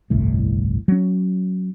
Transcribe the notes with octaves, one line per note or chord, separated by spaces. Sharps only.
G1 C2 F2 A2
F#3 C#4